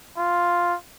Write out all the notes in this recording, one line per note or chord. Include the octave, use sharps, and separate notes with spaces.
F4